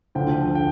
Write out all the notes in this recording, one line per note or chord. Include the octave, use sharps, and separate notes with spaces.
D2 D3 F3 G5
G5